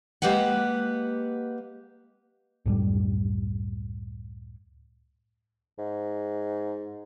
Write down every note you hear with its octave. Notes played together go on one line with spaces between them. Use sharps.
G#3 A#3 G4 B4 F#5
C#2 F#2 A2 G3
G#2